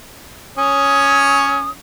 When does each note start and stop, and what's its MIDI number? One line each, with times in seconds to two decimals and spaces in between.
0.58 1.70 61
0.58 1.70 73
0.58 1.70 87